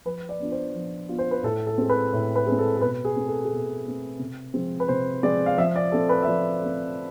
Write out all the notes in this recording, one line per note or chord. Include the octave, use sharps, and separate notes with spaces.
F3 B4
D5
B3 D4 F4
C5
F3
B3 D4 F4
C5
B4
A2 A4
A4
G#3 C4
B4
A2
B4
G#3 C4
A4
A4
B2 B4
G#4
A3 C4
A4
G#4
B2 A4
A3 C4
C3
F3 G#3 C4
B4
C3 C5
F3 G#3 C4 D5
F5
F3 E5
D5
A3 C4 A4
B4
E5
F3 D5
A3 C4